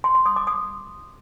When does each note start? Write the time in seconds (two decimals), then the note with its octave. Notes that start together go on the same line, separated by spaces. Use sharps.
0.04 C6
0.15 C6
0.26 D#6
0.36 D6
0.47 D#6